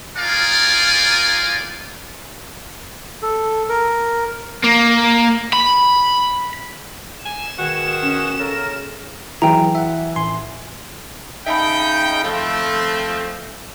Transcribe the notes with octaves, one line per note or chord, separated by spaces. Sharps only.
D#4 F4 A#4 D5 F5 G#5
A4
A#4
A#3
B5
G#5 E7
B2 D#3 F#4 G#4
C#4
C#3 A4 A#4
E3 F#3 G#4 G5 A#5
E5 F#5
A1 G#5 C6
C#3 D#4 E5 G5 A5 B5
F3 A3 C4